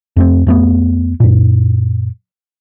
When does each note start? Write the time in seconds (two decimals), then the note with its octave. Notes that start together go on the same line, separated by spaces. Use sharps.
0.17 F2 A3 C4
0.47 F2 A3 B3
1.20 F#2 A#2